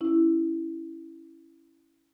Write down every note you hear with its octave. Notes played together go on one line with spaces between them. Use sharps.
C#4 E4